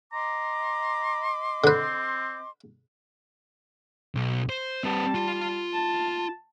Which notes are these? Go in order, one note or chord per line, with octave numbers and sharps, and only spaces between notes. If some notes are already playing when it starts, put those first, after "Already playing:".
D#5 A#5 C6 D6
D3 C4 B4
B1
C5
G3 C4 B4 A5
F4 C6
A5